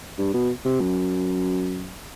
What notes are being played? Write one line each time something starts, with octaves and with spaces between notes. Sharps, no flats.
G2
B2
C3
F#2